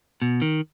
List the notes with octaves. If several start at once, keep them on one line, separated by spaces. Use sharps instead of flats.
B2
D#3